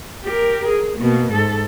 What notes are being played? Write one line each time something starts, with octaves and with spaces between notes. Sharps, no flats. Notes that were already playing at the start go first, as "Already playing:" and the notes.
G4 A#4
G#4
B2 A#3
G#2 A4